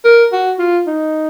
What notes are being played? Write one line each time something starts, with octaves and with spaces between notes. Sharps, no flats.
A#4
F#4
F4
D#4